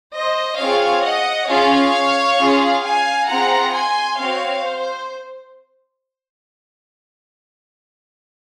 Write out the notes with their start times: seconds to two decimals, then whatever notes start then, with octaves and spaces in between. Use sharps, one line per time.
0.14 C5 D#5
0.58 C4 F4 G#4 C#5 F5
1.03 D#5 F#5
1.48 C#4 F4 G#4 C#5 F5
2.38 C#4 F4 G#4
2.83 F5 G#5
3.27 C4 F4 G#4 F#5 A#5
3.73 G#5 C6
4.17 C4 F#4 C#5 F5
4.62 C5